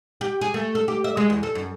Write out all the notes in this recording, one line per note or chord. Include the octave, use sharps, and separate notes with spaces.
G4
G#4
A3
A4
G4
E5
G#3
E2
A4
F#2